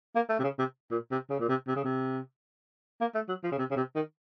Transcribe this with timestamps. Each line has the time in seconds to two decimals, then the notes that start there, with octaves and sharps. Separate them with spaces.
0.16 A#3
0.29 A3
0.39 C3
0.44 C#3
0.59 C3
0.91 A#2
1.11 C3
1.30 C#3
1.40 A#2
1.49 C3
1.68 C3
1.76 C#3
1.84 C3
3.01 A#3
3.15 A3
3.29 F#3
3.43 F3
3.52 C#3
3.58 C3
3.71 C#3
3.76 C3
3.95 D#3